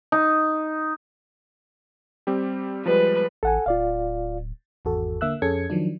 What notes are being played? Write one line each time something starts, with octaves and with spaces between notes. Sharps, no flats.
D#4
G3 C4 G4
F3 G3 G#3 B4
A1 A4 F#5 G#5
D1 F4 D5 F5
G#1 E2 F#4 A4
D3 A#3 E5 E6 F#6
F2 C#4 G#4 A4 G#6 C#7
D#3 F3 F#3 D4